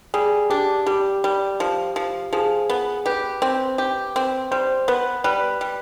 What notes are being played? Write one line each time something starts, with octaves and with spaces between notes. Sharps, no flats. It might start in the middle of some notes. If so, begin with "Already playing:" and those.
G3 G#4
D4 G4
G3 G4
G3
F3
F3
F3 G#4
B3
G4 B4
C4
G4
C4
G3 C5
B3 B4
G3 B4
G3